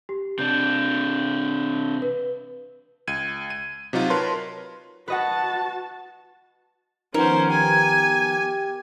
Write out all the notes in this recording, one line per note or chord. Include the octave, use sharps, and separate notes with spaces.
G4
C3 D4 G6
B4
C#2 G#6 D#7
D#7
C3 F#3 D#4 F4
A#4 B4 C#5 A5 C6
F#4 B4 D#5 F#5 A5
D#3 F3 B3 C#4 A#4 C5
G4 G#5